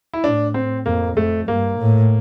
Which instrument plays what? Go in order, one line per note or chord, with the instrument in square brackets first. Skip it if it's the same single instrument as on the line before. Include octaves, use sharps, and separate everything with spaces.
[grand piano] E4
[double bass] A2 [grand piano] D4
[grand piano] C4
[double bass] F2 [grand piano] A#3
[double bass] F2 [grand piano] A3
[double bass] G2 [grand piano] A#3
[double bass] A2